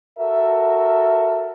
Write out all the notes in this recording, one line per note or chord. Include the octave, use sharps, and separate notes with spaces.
F#4 A4 A#4 E5